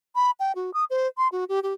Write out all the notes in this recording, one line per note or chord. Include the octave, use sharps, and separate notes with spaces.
B5
G5
F#4
D#6
C5
C6
F#4
G4
G4